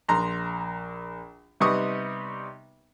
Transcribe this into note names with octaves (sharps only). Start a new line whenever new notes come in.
A#1 A#5 C6
C3 G3 B3 D#4 C#6 D#6